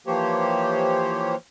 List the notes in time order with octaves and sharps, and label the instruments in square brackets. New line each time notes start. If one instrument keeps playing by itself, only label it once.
[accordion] E3 F3 A#3 G4 C5 C#5